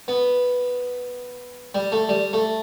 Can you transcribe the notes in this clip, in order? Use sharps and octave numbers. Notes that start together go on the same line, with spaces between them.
B3
G3
A3
G3
A3